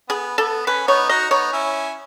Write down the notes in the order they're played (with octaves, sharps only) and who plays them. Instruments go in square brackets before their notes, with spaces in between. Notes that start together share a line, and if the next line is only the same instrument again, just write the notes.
[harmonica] B3 [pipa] G#4
[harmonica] B3 [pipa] A4
[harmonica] C#4 [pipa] B4
[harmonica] B3 D#4 [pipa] C#5
[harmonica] D#4 F#4 [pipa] D#5
[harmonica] B3 D#4 [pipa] C#5
[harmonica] C#4 E4